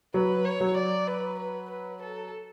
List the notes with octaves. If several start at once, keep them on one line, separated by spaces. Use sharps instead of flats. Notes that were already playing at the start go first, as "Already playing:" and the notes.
F#3 B4
C#5
F#3
D5
B4
B4
B4
A4